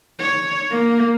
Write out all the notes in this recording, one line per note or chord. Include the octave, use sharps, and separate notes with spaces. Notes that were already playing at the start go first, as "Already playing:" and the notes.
C#5
A#3